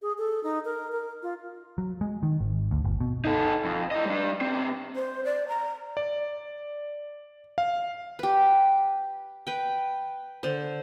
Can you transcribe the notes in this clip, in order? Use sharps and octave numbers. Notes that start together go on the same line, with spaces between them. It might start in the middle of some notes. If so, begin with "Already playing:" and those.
G#4
A4
D#4
A#4
A#4
F4
F#3
G#3
D#3
G#1
D2
G1
B2
D#4 A4
F2
E4 D#5
G3 D4
B2 C4
C5
D5
A#5
D5
F5
G4 B4
B4 G5
D3 C5